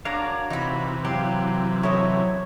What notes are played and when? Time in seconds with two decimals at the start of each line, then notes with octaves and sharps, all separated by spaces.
0.05 D4 F#4 A#4 C#5 F5 A#5
0.50 C3 E3 D#4 B5
1.05 F#3 G4 F5
1.83 E4 A4 C#5 D#5